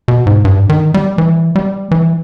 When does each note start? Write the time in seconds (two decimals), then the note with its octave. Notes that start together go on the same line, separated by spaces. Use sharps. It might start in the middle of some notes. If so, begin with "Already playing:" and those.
0.08 B2
0.27 G#2
0.45 G2
0.69 D#3
0.94 G3
1.18 E3
1.56 G3
1.91 E3